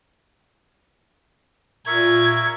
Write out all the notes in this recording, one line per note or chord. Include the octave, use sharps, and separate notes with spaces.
A#2 A#4 E5 C#6 G#6